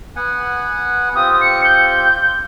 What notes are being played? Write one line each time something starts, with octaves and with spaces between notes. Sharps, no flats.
B3 F#5 G#5
C4 F4 G4 D#6
C#7
G6